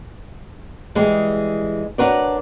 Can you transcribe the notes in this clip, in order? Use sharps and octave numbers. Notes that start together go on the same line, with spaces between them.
E3 G3 G#3 G#4
D4 F#4 A#4 B4 C#5 D5